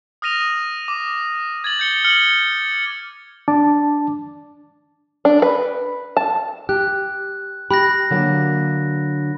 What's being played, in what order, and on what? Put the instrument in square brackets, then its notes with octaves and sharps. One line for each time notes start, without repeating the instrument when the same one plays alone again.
[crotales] D#6 F6 A#6 D#7 F7
D6
G#6 A6 F#7
G6 C#7 G7
F6 C#7 F#7 G7
[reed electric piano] D4 A5 D6
[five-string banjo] D4
B4
A5
[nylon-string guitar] G4 [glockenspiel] F#6
[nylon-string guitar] G4 [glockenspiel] B5 F#6 A#6
[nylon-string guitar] D3 F#3 A#3